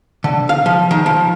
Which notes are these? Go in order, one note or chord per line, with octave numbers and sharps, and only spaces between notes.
D3
F5
F3
D#3
F3